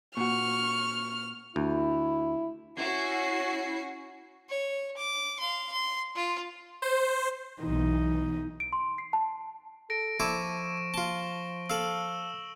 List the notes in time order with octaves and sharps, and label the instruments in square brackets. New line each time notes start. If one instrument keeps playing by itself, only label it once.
[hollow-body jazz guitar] A#2 F#4 [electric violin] C#6 [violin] F6
[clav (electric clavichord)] D2 [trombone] E4
[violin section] C#4 F#4 C7 [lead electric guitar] E4
[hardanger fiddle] C#5
D6
F5 C6
C6
F4
[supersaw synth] C5
[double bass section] B1 E3 [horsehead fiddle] D#4
[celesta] D7
C6
C7
A5
[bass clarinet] A4 [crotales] A#6 D7
[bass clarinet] F3 [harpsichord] E4 A4 D5 [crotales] C#6 E7
[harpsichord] F4 A5 [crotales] G7
[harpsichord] A4 F5 [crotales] E6 E7 F#7